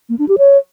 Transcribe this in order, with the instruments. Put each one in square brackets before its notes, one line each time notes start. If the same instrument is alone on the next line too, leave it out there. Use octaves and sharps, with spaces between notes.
[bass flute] A#3
D4
G4
C#5